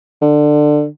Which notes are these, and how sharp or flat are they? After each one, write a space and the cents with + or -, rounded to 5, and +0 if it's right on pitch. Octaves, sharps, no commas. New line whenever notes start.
D3 +20